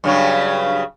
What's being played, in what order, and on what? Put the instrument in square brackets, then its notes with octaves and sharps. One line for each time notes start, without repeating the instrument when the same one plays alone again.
[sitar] G2 C#3 F#3